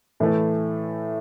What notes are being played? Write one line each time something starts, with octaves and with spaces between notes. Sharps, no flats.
A2 E3 A3 E4